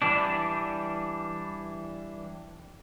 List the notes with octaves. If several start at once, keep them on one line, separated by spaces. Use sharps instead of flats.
E3 G3 D4